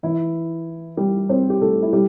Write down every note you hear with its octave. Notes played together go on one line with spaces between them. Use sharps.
E3 E4
G3 G4
C4 C5
G4
A3 A4
E4
G3 G4